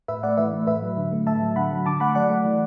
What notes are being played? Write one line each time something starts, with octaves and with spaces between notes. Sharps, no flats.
A2 B4 E5
A3 D5 F#5
E3 B4 E5
A3
A2 B4 E5
F#3
D3
A3
A2 E5 A5
F#3
D3 F#5 B5
F#3
D3 A5 D6
A3 F#5 B5
F#3 D5 F#5
A3
E3